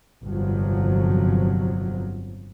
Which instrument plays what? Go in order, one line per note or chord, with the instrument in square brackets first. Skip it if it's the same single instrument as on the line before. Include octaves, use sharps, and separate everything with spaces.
[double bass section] G1 F2 C3 F3 F#3